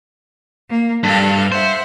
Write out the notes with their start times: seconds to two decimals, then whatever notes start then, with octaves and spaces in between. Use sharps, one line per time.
0.69 A#3
1.03 G2 A4 F5
1.52 C5 E5 F#5